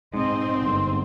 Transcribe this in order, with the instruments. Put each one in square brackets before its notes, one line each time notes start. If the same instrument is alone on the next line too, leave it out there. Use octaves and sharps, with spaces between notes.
[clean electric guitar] G#2 [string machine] C4 [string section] D#5 [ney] C6
[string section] G1